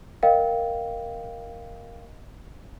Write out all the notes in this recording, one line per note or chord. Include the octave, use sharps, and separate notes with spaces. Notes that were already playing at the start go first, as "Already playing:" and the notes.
A#4 D#5 F5 G5